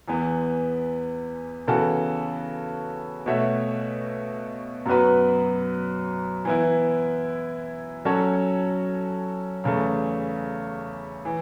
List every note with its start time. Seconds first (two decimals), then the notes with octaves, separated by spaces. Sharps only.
0.08 E2 E3 B3
1.68 C#3 E3 B3 F#4 A4
3.26 B2 A3 F#4 C#5 E5
4.86 F#2 F#3 B3 F#4 B4
6.45 E3 B3 E4
8.05 F#3 C#4 F#4 A4 C#5
9.64 E2 C#3 A3
11.25 E3